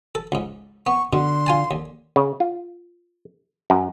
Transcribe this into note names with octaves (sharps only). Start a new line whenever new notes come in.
A4
C#2 G#2
B3 C#6
B2 D3 C6
F4 G#5 A5
D#2
C#3
F4
F#2